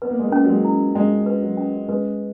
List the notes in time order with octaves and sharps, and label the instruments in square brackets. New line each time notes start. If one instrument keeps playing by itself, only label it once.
[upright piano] B3 [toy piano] B4
[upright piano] A#3
G#3
A#3
[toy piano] C#4
[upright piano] F#3
G#3
[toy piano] E4
[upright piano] G#3 [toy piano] C#4
[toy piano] B4
[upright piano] F#3
[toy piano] C#4
[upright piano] G#3 [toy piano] B4